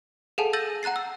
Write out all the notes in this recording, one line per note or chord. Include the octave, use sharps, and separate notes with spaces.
G#4 A4 F5 F#5 G#5 A5
E6 G6 A6 A#6 D#7 F#7
F#5 A#5 F#6 A6 C7
E6